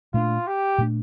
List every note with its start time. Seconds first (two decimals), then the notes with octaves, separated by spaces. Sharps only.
0.14 A#2 A3 D4 F4
0.47 G4
0.78 A#2 A3 D4